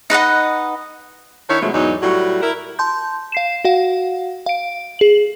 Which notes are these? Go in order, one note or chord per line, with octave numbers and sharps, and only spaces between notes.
D#4 B4 D#5 F#5
D#3 D4 E4 C#5
B2 D#3 F3 F#3 G#3 A3
E2 G#2 F#3 D4 D#4
A2 F#3 G3 F#4
E4 A#4
A5 C6 G6
F5 C7 E7
F#4 F5 F#5
F5 D7
G#4 F#7